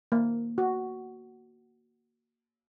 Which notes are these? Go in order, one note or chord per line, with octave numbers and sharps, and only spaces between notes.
A#3
F#4